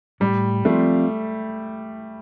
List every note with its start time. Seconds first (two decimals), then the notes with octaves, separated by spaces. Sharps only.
0.20 A2 G3
0.65 F3 A3 C4 F4 D5